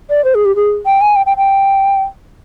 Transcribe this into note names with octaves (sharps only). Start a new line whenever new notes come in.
D5
C5
G#4
G4
G#4
G5
G#5
G5
G5
G5